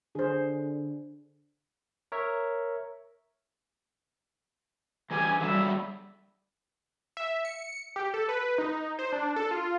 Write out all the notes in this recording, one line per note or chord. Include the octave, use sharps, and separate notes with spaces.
D3 G#4 C5
A#4 C#5 E5
E3 G3 G4 G5 G#5
D3 F#3 G3 E5
E5
C#7
G4
A4
B4
D#4
C5
D4
A4
F4